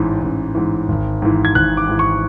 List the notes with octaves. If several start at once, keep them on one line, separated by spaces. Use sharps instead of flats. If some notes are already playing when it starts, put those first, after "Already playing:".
Already playing: A1 G#2 E3
A1
G#2 E3
G#1
G#2 E3
G#6
G#1 F#6
D6
G#2 E3
C#6